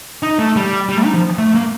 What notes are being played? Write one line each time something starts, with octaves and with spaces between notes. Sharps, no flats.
D#4
A3
G3
G3
A3
D#4
F3
A3
A#3